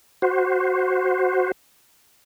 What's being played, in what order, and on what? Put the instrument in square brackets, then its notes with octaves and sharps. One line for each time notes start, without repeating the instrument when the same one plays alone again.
[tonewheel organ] F#4 C5